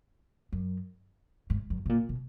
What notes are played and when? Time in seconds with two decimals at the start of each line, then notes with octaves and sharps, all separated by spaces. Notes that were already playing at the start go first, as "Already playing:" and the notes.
0.53 F#2
1.50 G#2
1.70 F#2
1.86 B2
1.89 A#2
2.09 B2